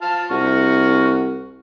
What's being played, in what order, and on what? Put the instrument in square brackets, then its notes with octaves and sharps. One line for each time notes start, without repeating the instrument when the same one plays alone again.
[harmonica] F4 F5 A5
[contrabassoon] C2 [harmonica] F#4 C#6 F6